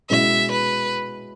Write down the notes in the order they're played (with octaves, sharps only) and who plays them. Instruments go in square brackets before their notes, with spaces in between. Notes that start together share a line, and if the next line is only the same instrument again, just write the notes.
[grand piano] B2 G#3 C#4 E4 [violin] E5
[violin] B4